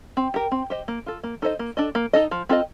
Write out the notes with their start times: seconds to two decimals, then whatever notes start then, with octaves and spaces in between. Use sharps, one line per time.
0.17 C4
0.34 G4 A#4
0.52 C4
0.70 G4 C5 D#5
0.88 A#3
1.06 F4 A4
1.24 A#3
1.42 D#4 A4 C5 D#5
1.59 A#3
1.77 D4 A4 D#5
1.95 A#3
2.13 D#4 A4 D#5
2.31 F3
2.49 C4 F4 A4 D#5